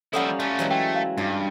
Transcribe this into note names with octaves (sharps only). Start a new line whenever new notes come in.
F3 G3 A#3 C#4 E4 A4 F#5
A3 C#4 F4
E3 F#3 G#3
A3 G5
F5
G2 F4